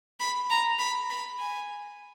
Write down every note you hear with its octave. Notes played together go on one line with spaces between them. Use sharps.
B5
A#5
B5
B5
G#5